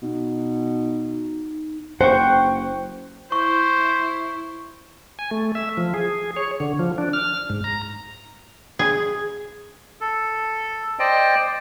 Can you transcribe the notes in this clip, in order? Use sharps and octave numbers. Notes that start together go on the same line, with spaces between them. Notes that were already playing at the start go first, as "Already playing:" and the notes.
B2 D#4
F#1 C5 F#5 G5 C#6
E4 C5 C#6
G#5
A3
E5
F3
G#4
C#5
D3
F3
D4
F6
G#2
A#5
G#4
A4
C5 D5 D#5 G5